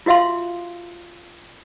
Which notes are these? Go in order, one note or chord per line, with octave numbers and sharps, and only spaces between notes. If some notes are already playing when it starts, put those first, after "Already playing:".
F4 F#4 E5 F5 C6